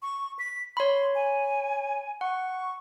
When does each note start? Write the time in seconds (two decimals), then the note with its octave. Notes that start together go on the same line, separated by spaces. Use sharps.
0.02 C#6
0.39 B6
0.77 C#5 B5 C6
1.15 G#5
2.21 F#5 C#6